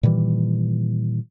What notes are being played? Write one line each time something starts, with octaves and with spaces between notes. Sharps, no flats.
A#2 D#3 E3 G3